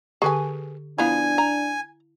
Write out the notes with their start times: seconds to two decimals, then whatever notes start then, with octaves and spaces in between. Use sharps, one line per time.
0.22 D3 G4 G#4 B4 G#5 C#6
0.98 F3 B3 D4 E4 F5 G#5
1.38 A#5